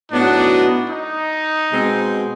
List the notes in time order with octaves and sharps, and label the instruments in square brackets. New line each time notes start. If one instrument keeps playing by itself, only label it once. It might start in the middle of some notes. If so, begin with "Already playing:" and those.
[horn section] A2 F#3 B3 D#4 F#4 [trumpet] D4
[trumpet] D#4
[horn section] B2 G#3 C4